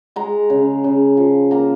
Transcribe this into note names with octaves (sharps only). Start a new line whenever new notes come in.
G#3 A#5
C#3
C#3
F3
A#3 A#5